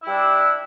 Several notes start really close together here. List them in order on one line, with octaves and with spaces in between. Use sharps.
E4 G3 D4